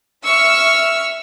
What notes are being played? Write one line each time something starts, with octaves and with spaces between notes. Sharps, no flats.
E5 C#6 E6 F6